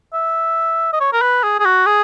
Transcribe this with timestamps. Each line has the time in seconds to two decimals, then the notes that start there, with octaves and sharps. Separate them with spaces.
0.13 E5
0.93 D#5
1.01 C#5
1.13 A#4
1.22 B4
1.43 G#4
1.60 G#4
1.65 F#4
1.86 G#4